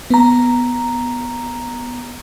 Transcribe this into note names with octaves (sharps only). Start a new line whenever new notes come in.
B3 A#5